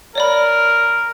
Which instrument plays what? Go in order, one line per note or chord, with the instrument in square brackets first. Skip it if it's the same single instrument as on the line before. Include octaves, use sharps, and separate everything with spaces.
[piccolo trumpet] A#4 [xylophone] C#5 D5 B5